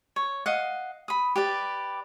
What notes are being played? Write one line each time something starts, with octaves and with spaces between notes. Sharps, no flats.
C#5
D#5 F5 F#5
B5 D#6
G4 B4 D5